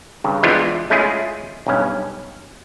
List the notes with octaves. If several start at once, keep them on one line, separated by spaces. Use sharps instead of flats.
G2 C#3
E3 F3 G#3 B3 D4 F4
G#3 A3 C#4 E4 F4 G#4
B1 G2 C#4